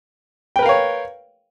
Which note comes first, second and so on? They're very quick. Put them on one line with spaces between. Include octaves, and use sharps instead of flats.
G5 B4 A#4 F5 C#5